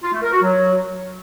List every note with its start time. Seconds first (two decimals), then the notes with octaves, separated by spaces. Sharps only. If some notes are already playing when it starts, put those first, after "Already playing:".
0.03 F4
0.13 A3
0.23 A#4
0.32 F#4
0.42 F#3